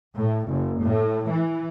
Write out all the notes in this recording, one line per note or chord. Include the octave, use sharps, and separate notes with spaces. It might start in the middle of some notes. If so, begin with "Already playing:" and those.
A2
F#1
A2
E3